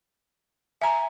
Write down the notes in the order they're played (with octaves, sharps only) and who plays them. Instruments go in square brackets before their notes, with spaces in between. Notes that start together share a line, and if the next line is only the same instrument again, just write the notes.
[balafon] E5 A#5 [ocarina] G#5